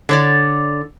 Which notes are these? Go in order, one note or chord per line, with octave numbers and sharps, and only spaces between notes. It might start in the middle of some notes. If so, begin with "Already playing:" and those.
D3 C#5 D5